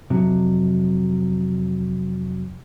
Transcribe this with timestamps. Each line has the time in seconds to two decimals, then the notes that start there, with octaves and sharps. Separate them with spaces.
0.10 F2 C3 F#3